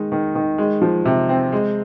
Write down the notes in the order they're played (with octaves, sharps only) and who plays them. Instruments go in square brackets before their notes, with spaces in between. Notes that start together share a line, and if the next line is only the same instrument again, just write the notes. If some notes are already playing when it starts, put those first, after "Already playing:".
Already playing: [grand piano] D#3 G#3 D#4
D#3
D#3
G#3
F3
C3
C4
G#3